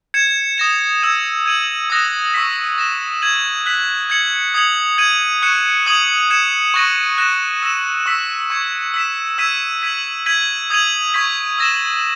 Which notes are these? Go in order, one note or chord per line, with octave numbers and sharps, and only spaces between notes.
G#6 C#7 E7
D#6 A#6 E7
E6 G#6 D#7
G#6 D#7 F#7
D#6 F#6 A#6 E7
C#6 E6 B6
D#6 A#6 E7
G#6 D#7 F#7
F#6 B6 F#7
G#6 C#7 F#7
D#6 G#6 C#7 F#7
G#6 D#7 F#7
C#6 F#6 C#7 E7
D#6 G#6 D#7 F#7
G#6 C#7 E7
C#6 F#6 A#6 D#7
F#6 A#6 E7
E6 A#6 E7
C#6 E6 B6
C#6 G#6 C#7
E6 B6 E7
E6 G#6 B6 D#7
G#6 B6 D#7 F#7
G#6 B6 D#7 F#7
D#6 G#6 D#7 F#7
C#6 G#6 B6 F#7
E6 A#6 E7